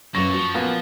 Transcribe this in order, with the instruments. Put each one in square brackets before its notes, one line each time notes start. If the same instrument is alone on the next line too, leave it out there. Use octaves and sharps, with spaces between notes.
[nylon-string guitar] F#2 F4 B4 [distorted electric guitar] A#2 [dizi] C#6 [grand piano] A#6
[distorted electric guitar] F3 [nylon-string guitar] F#4
[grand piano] A#2 A#3 B3